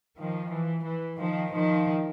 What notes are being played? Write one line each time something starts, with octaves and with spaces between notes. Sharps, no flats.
D#3 F3
E3
E3
D#3 F3
D#3 F3